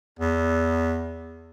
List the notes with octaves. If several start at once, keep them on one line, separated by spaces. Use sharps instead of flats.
E2